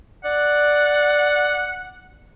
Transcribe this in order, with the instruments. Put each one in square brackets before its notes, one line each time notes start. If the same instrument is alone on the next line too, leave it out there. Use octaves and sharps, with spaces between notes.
[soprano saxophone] D5 [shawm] F#5